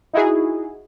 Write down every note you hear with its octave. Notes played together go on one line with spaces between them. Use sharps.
D#4 E4 F#4 G#4